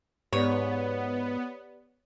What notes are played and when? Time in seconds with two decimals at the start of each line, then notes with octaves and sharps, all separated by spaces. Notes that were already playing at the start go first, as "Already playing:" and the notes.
0.32 G#2 B3 G4 B4 C#5 D5